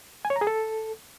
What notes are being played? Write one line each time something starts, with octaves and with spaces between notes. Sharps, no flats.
G#5
C#5
A#5
G#4
A4